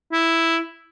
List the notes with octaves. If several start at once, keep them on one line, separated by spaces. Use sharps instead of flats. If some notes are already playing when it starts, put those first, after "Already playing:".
E4